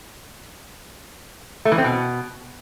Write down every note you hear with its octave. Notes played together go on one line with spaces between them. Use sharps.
A3
E3
C4
B2